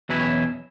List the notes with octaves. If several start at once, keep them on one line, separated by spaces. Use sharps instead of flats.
E2 B2 F#3 C#4 E4 B4
C#5